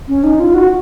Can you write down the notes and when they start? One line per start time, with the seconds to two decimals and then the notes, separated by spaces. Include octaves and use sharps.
0.08 C#4
0.24 D#4
0.40 F4
0.54 F#4